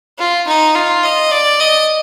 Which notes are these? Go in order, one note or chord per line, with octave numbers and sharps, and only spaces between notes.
F4
D#4
F4
D#5
D5
D#5